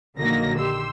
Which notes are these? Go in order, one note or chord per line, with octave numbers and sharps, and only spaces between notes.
A#1 D3 D#3 F#3 A#3 A#6
G4 C6 E6